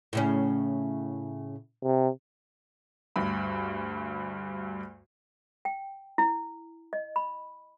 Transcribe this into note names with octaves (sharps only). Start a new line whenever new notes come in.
A2 C#3 C#4
C3
D2 G2 B5
G5
E4
D#5
B5